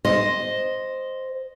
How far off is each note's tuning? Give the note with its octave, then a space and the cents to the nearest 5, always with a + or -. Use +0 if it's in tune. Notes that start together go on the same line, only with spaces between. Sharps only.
C5 +0 D#5 +0